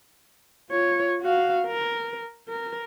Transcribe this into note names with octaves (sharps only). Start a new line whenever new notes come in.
F4 C#5
F#4 F5
A#4
A#4